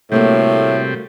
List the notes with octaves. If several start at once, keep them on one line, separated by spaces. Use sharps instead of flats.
A2 C3 G3 A3 A#3 F#4